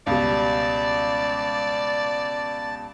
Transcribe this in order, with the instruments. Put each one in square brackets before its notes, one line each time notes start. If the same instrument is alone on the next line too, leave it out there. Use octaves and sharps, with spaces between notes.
[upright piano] C#2 B2 G3 [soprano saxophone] D5 [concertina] A5